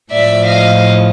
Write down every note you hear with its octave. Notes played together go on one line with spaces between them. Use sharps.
A2 F3 D5 E5
D#5 F5